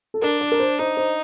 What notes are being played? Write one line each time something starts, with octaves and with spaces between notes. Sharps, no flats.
A4
D4 A#4
D5
A#4
C5
D#4 C5
C5